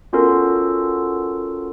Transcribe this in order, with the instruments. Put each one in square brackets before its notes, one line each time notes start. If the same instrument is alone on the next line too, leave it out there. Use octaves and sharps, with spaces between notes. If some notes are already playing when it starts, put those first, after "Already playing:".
[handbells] B3 C#4 F4 F#4 A4 A#4